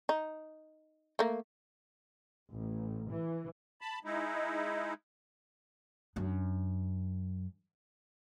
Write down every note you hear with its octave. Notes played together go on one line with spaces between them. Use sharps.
D#4
A3 A#3
A1
E3
A5 B5
G#3 D#4 E4
F#2 D4